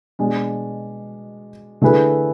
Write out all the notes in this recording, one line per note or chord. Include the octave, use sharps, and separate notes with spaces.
B2 G#3 D4
D3 A3 E4 G#4 B4